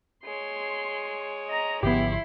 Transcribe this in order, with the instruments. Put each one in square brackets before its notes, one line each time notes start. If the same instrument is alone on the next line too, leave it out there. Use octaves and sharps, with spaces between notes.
[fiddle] G#3 C#5 [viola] C6
[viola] D#5 A#5
[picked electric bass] G#1 D3 F3 [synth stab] B3 G4 [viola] E4 C6